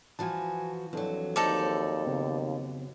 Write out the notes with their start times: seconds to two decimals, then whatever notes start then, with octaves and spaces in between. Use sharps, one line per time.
0.19 E3 F3 F#4 G#5 A5
0.93 F2 E3 F#3 D4 A4
1.36 D#2 D#4 A4 C5 D5 A5
2.07 C#3 B3 C4